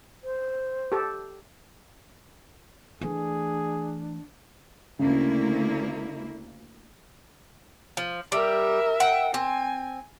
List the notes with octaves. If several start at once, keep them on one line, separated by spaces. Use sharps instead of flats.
C5
G4 A4
E3 A3 D4 G#4
D2 C#3 A#3 E4
F3
G3 A#4 E5
F#5 G5
C4 G#5